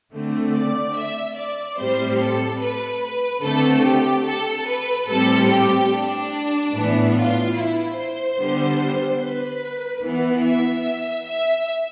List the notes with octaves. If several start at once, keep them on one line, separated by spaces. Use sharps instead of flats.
D3 A3 C4
D5
E5
D5
A2 G3 C4 C5
A4
B4
B4
D3 A3 C4 A4
G4
A4
B4
A2 G3 C4 A4
G4
D4
A2 E3 B3
F4
E4
C5
D3 G3 B3
B4
E3 B3
E5
E5